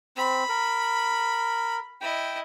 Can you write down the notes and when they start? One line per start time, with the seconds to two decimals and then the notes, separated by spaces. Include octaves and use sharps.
0.17 C4 B5
0.49 A#4
2.01 E4 D#5 G5